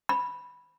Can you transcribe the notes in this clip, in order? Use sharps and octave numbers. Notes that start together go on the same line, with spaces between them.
B5